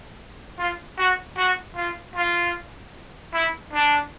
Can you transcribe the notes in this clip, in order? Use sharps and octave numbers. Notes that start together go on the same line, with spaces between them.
F4
F#4
F#4
F4
F4
E4
D4